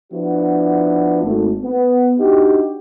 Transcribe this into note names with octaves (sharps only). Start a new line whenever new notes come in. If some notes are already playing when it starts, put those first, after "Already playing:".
F3 B3 D4 E4 F#4
G#1 A3
B3
D4 D#4 F#4 G4